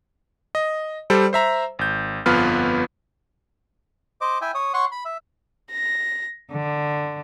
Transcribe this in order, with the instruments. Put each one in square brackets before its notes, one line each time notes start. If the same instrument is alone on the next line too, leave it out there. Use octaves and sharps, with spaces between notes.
[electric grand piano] D#5
G3 A4 C5 D5
C5 E5 A#5
G#1 G6
G1 F2 B3 F4 B4 F6
[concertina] C5 D#5 D6
E4 E5 G5 G#5
C#5 D#6
C#5 F#5 C6 C#6
B5
E5
[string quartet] A#6
D3